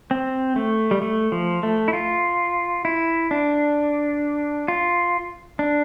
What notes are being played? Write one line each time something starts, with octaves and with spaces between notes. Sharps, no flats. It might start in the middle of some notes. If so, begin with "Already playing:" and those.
C4
A3
G3
A3
F3
A3
E4
F4
E4
D4
F4
D4